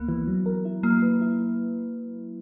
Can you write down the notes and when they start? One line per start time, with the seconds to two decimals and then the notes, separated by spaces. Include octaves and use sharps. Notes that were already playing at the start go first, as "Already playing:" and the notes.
Already playing: C#2 A#3 B3
0.09 E3
0.27 F#3
0.46 A#4
0.65 E4
0.83 F#3 A#3
1.02 B4
1.21 E4